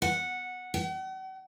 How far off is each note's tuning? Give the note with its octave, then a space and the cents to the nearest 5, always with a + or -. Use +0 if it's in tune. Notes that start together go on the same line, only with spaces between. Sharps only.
F#5 -10
F#5 +45